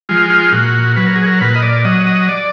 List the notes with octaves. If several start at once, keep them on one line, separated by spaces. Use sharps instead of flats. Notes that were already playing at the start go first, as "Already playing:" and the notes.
F3 G#3 F4
F4
A#2 F#4
F#3 B4
A#4
G#4
A#4
A#2 B4
D#5
D5
F#3 D#5
D#5
D5